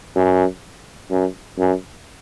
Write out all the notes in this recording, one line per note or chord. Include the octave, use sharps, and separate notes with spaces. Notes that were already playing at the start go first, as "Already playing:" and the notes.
F#2
F#2
F#2